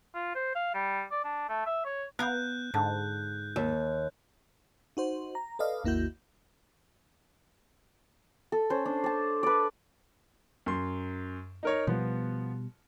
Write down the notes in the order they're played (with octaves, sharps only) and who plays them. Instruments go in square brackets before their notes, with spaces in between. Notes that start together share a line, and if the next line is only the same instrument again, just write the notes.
[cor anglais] F4
C5
F5
G3
D5
D4
A3
E5
C#5
[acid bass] B3 [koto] A#4 F5 [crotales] F#6 G6
[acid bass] G#2 [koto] D3
[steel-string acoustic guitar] D#2 [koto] E5
[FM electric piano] D#4 F#4 C5
A#5
A4 B4 D5 D#5 F5
G#1 D#2 A#3 E4 F#4 G6
[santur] A4
C#4 C5
D4
D5 A5
B4 D5
[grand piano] F#2 C6
D#4 A#4 C#5
[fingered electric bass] B2 G3 [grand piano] F3 B3